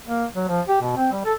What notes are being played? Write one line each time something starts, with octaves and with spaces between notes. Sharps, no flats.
A#3
F#3
F3
G4
B2
C4
G3
A4